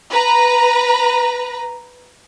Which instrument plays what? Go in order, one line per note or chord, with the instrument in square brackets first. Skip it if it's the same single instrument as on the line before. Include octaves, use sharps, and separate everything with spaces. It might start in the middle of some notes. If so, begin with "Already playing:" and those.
[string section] B4 A#5